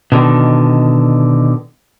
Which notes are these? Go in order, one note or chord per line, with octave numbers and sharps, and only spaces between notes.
B2 D3 D#3